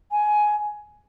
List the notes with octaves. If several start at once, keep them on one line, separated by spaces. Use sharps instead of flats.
G#5